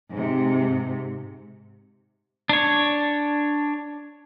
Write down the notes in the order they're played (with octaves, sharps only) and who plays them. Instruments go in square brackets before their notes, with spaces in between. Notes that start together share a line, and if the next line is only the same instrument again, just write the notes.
[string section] G#2 C3
[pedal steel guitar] D4 C#5